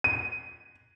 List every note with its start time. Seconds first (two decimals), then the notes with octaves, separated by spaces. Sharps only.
0.04 D#7